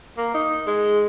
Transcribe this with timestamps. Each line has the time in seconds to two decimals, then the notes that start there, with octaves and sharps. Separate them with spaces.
0.17 A#3
0.34 D#4
0.67 G#3